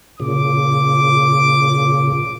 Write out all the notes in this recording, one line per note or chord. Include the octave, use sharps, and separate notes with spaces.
A#2 C#3 D6